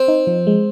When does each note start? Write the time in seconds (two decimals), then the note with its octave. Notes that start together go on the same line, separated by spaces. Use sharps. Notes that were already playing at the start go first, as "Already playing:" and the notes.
Already playing: C4
0.08 D#4
0.27 F3
0.47 G#3